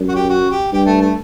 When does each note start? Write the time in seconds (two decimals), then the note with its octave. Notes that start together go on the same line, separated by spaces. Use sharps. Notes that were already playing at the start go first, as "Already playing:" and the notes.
Already playing: F#2
0.09 F#4
0.15 G4
0.29 F#4
0.51 G4
0.72 G2 G4
0.86 A3
1.01 A3